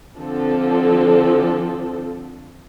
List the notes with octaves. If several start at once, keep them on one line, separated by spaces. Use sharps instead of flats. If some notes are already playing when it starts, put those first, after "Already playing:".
D3 F3 C4 A4